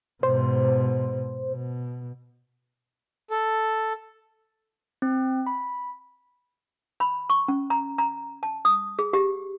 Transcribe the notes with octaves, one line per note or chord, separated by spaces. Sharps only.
G#2 B2 C5
B2
A4
C4
B5
B5
C#6
C#4
A#5
A#5
A5
D#6
G#4
G4